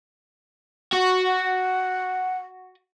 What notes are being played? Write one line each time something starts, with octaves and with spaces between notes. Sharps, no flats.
F#4
F#5